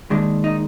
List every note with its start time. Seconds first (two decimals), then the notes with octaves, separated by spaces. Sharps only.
0.10 D#2 D#3 G#3 D4
0.44 D#4